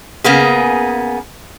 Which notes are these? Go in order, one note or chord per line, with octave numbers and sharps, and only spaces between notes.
C#3 A#3 B3 G#4